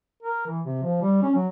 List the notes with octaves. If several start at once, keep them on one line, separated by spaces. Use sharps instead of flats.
A#4
E3
C3
F3
G3
C#4
F#3